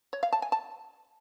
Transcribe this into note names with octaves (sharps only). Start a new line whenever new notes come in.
C#5
F5
A5
G#5
A5